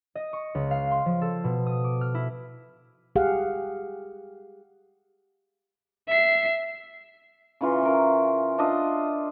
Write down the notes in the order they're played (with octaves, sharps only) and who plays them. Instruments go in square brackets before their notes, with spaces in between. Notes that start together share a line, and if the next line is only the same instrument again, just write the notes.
[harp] D#5
C#6
C#2
F5
C6
F3
A4
B2
D#6
D6
F6
E4
[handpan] G4 G#4 F5 F#5
[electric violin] E5 C7
[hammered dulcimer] C#3 E3 F4
C#4 A#4
D4 F4 D#5 E5